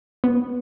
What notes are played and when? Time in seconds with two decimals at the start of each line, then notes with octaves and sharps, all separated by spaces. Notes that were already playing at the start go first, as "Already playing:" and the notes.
0.24 B3